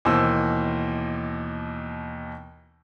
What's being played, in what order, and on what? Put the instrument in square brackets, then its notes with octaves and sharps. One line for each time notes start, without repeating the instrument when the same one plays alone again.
[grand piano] D#2 B2 E3 C5 E6